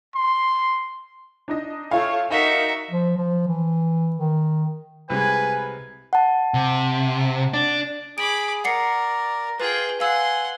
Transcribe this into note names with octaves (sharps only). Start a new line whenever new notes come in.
C6
D4 D#4 D#5
A3 F4 A4 C#5 F5
D#4 F#4 A#4 E5 F5
F3
F3
E3
D#3
C2 G3 G#3 B4 G#5
F#5 A5
C3
D4
G#4 B5 D6 D7
A#4 D5 F#5 C7 C#7
F4 G#4 B4 G5
F5 F#5 G#5 C6 E6